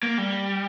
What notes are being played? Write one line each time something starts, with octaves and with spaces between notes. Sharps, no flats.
A#3
G3